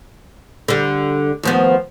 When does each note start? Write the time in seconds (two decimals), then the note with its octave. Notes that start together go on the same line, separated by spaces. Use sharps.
0.68 D3 G3
1.43 D#2 F3 B3